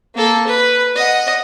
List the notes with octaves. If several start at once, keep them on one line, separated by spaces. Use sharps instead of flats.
A#3 A4
B4
D#5 F#5